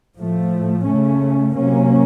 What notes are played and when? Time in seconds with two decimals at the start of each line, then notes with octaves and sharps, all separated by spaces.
0.17 A2 F3 A3
0.86 C#3 A3 C#4
1.55 C3 F#3 A#3 C#4